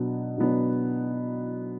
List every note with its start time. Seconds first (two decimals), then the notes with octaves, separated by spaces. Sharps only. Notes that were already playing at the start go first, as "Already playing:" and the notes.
Already playing: B2 F#3 B3 D4
0.38 B2 F#3 B3 D4